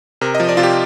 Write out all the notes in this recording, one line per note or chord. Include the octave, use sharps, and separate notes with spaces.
C3 A#4
D#5
F3
D5
C3 F4
G4